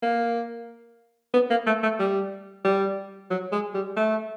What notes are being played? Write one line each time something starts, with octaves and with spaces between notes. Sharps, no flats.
A#3
B3
A#3
A3
A3
G3
G3
F#3
G#3
G3
A3